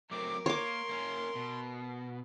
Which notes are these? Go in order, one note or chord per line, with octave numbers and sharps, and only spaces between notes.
F#3 A3 C4 A#4 D6
A#3 C#5 C6 D6
A#3 C#4
B2